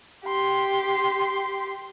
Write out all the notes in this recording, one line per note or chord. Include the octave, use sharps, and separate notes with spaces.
G4 C6